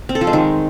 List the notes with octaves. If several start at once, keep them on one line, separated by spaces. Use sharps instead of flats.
C4
A4
F3
G#3
D#3